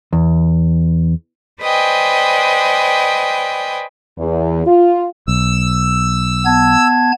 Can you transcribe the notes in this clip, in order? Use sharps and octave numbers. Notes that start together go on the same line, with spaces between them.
E2
B4 C5 D5 D#5 G5 G#5
E2
F4
B1 E6
B3 A5 G#6